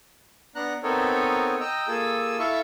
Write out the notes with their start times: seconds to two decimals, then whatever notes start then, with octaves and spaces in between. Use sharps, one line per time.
0.55 B3 D4 F#5 A#5 F#6
0.83 B3 C4 D#4 A4 A#4 C#5
1.60 D#5 G5 A#5 E6
1.88 A#3 F4 G#4 A4 E6
2.39 E4 A4 E5 F5 C#6